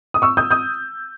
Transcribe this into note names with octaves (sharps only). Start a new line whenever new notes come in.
D#6
C#6 E6
D#6 G6
D#6 G6